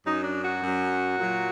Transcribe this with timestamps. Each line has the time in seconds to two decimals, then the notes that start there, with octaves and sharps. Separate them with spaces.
0.04 F#2 F#3 D#4
0.23 D4
0.42 F#4
0.60 F#2 F#3
1.17 A#2 F#3